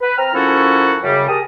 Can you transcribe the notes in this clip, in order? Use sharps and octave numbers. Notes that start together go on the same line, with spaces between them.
B4
C4 A#5 F6
F3 A#3 C#4 E4 F#4 A4
F#2 C#3 G3
G4 G#4 A#4 A5 D#6